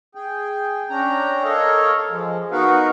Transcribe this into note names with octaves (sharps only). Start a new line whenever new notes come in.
G#4 G5
C#4 D4 G5 A#5
A4 A#4 C#5 D#5 F5
F3 G#3
B3 D#4 F#4 A#4 B4 F5